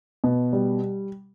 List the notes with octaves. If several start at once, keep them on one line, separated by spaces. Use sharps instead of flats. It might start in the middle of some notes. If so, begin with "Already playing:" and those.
B2
G3